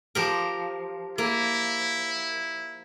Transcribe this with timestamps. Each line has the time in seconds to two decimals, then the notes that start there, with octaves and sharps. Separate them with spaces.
0.15 F3 G4 A#4
1.18 A#3 E4